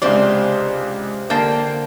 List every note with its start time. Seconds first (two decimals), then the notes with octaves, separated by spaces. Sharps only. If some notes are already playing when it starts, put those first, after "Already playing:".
0.02 C#2 C3 D4 C5 D5 C6
1.30 D3 A#3 C5 G5 A5